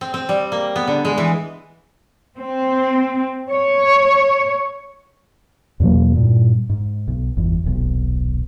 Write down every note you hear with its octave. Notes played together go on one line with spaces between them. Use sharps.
C4
C4
G3
A#3
B3
D3
G#3
E3
C4
C#5
E2 B2 F#3 A#3
G2 A#2
G#2
B1
G1 E2
D#1 B1